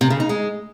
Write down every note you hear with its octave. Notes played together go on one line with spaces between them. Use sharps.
C3
C#3
D#4
G#3